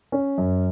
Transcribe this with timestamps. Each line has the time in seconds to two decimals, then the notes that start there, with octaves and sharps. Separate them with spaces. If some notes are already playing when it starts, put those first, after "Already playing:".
0.12 C#4
0.38 F#2